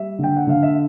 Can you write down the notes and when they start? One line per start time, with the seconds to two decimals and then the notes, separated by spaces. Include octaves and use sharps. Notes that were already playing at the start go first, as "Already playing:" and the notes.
Already playing: G3 E5
0.19 D3 G5
0.36 F#5
0.47 D3 F5
0.63 E5